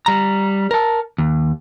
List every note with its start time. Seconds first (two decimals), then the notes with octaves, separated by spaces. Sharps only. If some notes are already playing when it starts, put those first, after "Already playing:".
0.06 G3 A#5
0.71 A#4 A5
1.18 D#2